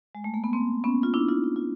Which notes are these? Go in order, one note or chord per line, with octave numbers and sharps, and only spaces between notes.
G#3
A3
A#3
B3
A#3 C4
B3 C#4
F4
D4 E4
D#4 F4
E4
F4